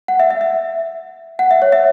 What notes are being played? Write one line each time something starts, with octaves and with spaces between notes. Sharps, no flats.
F#5
E5
E5
E5
F#5
E5
C#5
E5